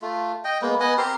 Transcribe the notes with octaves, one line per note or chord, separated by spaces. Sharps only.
A3 F4
D#5 G5
G#3 A#3 B3
B3 D#5 F#5 G#5
C4 G4 A#4 C6